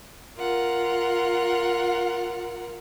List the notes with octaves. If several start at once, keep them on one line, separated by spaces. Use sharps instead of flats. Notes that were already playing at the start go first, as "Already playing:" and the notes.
F4 A#4 F#5